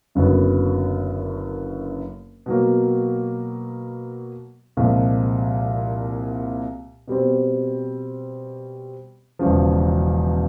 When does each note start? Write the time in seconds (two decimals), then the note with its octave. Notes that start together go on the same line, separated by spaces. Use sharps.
0.15 F#1 F#2 D3 F#3 B3
2.46 B2 F#3 A#3
4.77 C2 A#2 F3 G#3
7.08 B2 G3 C4
9.39 E1 E2 C#3 F3